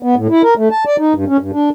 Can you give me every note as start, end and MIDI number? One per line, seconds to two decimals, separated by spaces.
0.03 0.15 59
0.16 0.27 45
0.30 0.42 64
0.43 0.54 70
0.57 0.69 57
0.71 0.84 81
0.86 0.96 74
0.98 1.13 63
1.14 1.25 43
1.28 1.37 61
1.40 1.51 43
1.53 1.70 62